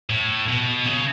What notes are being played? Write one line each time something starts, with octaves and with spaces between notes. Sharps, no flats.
A2
B2
C#3